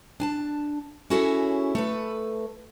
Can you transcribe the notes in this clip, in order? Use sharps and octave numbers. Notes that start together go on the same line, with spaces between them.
D4 G#5 A5
C#4 E4 F#4 G#4 A4 C#5
A3 A4 B4